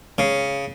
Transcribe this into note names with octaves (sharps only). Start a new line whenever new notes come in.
C#3